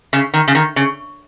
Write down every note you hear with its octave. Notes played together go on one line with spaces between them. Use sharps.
C#3
D#3
C#3
D#3
C#3